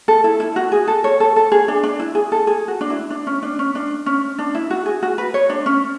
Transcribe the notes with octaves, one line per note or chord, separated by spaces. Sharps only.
A4
E4
E4
F#4
G#4
A4
C#5
A4
A4
G#4
D4
D4
E4
G#4
A4
G#4
F#4
D4
E4
D4
C#4
D4
C#4
D4
C#4
D4
E4
F#4
G#4
F#4
B4
C#5
D4
C#4